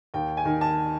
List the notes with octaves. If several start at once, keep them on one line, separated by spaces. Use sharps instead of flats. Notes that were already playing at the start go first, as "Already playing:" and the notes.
D#2 G5
G#5
D#3
A5